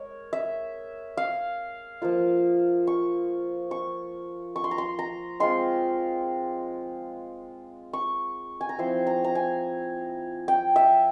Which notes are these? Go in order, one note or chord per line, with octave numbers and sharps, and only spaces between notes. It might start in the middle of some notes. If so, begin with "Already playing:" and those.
Already playing: G#3 A#4 C#5
E5
F5
F3 A#3 F4
C#6
C#6
C#6
C6
A#5
C6
A#5
G#3 C4 F4 C6
C#6
G#5
A#5
F3 C4 E4 C6
A#5
A#5
G#5
G5
E5